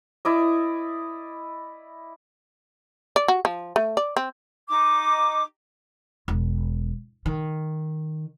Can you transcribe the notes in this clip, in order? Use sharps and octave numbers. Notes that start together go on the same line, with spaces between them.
E4 D5 D#5
D5
F#4
F3
A3
D5
C4
D#4 D6
E1
D#3